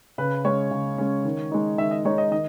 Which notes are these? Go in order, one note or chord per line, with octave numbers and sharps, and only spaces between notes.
C#3 B4
G#3 C#4 C#5
C#3
G#3 C#4
D#3
G#3 D#4
D#3 E5
D#5
G#3 D#4 C#5
D#5
D#3 D#5